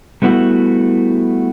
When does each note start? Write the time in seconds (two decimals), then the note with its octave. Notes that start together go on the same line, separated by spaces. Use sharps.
0.22 G3 A3 B3 E4 F#4